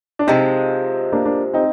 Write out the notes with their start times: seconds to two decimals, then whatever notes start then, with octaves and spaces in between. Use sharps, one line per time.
0.19 D4
0.27 C3 F3 G#3 C4 D#4
1.12 A#3 D4
1.25 A#3 D4
1.53 C4 D#4